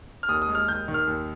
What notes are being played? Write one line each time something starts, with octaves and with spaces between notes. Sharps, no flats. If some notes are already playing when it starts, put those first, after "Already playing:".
F6
D#2 D#6
D#6
G#3
F6
D#2 G6
D#3
F6
D#2